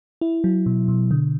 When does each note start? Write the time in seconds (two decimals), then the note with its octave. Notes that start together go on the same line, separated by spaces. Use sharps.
0.21 E4
0.44 F#3
0.66 B2
0.88 B2
1.11 D3